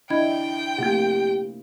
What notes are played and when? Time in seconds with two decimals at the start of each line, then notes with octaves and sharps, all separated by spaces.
0.10 D4 E4 D#5 G5 B5 G#6
0.79 F#2 C3 A3 A#3 F4 G4